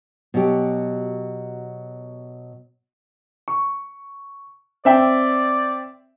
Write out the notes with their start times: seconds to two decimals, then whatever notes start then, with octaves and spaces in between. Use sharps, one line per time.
0.34 B2 F#3 G4
3.48 C#6
4.85 C4 D5 E5 G5